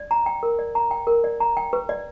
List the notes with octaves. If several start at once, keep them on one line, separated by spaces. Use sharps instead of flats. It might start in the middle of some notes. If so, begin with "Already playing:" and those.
Already playing: D5
A#5
G5
A#4
D5
A#5
G5
A#4
D5
A#5
G5
B4
D5